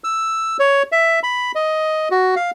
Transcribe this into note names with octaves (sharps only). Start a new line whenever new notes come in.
E6
C#5
E5
B5
D#5
F#4
F5